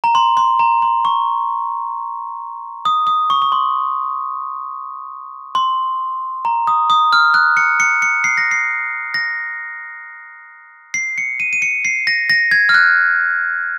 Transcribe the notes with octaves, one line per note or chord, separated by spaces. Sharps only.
A#5
C6
C6
A#5
C6
C#6
D#6
D#6
C#6
C#6
C6
C6
A#5
D#6
D#6
F6
F#6
C#7
C#7
C#7
C7
A#6
C7
A#6
C7
C#7
D#7
D#7
C#7
C7
A#6
A#6
G#6
F6
F#6